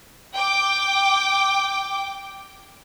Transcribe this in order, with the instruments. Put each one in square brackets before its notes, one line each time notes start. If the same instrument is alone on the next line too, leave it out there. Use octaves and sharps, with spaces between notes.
[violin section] G5 D6